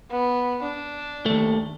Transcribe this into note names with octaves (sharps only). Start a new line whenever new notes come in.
B3
D4
D#2 A3